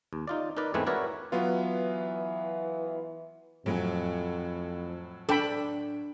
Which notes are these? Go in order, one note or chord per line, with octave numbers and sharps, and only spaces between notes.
D#2
D#4 F4 D5
D#4 A#4 B4 D5
E2 G#2 A3 C4 B4 G#5
E4 F#4 A#4 B4 C#5 D5
E3 F#3 B3 F4
F2 A2 F#3 G#5
D4 A4 G5 B5